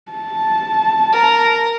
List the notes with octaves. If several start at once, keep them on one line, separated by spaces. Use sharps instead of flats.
A5
A#4 A#5